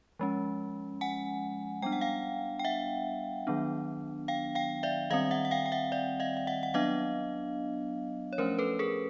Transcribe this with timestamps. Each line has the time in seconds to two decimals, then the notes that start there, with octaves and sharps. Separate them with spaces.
0.19 F3 G#3 C#4
1.01 F#5 G#5
1.82 G3 B3 D4 G5
1.92 F#5
2.01 F5 G5
2.59 G5
2.65 E5 F#5
3.47 D#3 F#3 B3 D4
4.28 F5 G5
4.55 F5 G5
4.83 D5 E5
5.10 D#3 G3 C4 D#5 F5
5.31 E5 F#5
5.45 F#5
5.51 F5 G5
5.66 G5
5.72 E5 F#5
5.92 D5 E5
6.20 D#5 F5
6.37 F5
6.47 E5 F#5
6.63 F#5
6.74 F#3 B3 D4 D#5 F5
8.33 C#5
8.38 F3 A3 C#4 A#4 C5
8.59 A4 B4
8.79 G#4 A#4